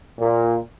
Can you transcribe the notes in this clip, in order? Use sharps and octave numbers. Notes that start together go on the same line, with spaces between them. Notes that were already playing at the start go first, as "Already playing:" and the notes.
A#2